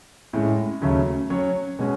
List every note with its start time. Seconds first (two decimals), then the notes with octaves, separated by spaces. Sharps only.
0.33 A2 G#3 C#4
0.82 D#2 C#3 F#3 A3 C#4
1.30 F#3 C#4 F#4 C#5
1.79 B2 G#3 C#4